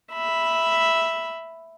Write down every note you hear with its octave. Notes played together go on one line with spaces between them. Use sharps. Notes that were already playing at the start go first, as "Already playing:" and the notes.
E5 B5